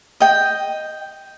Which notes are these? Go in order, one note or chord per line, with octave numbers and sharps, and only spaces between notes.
D#5 G5